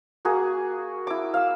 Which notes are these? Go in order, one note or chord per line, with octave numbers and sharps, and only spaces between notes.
A#3 F#4 G#4
E4 D6
F5 E6